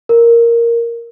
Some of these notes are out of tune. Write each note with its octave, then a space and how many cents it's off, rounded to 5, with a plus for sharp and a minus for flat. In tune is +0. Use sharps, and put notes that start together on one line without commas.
A#4 +0